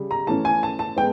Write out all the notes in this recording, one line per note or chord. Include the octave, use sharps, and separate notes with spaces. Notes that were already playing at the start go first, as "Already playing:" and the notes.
Already playing: C#3 G3
A#5
E3 A3 C#4 A5
G#5
A5
A5
G#3 B3 G5